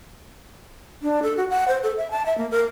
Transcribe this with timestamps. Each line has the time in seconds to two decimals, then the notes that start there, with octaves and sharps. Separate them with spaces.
1.02 D4
1.23 A4
1.37 F#4
1.50 F#5
1.68 C5
1.83 A4
1.97 E5
2.11 A5
2.26 E5
2.38 A#3
2.51 A#4